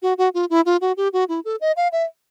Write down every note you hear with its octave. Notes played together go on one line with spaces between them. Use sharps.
F#4
F#4
F4
E4
F4
F#4
G4
F#4
E4
A4
D#5
F5
E5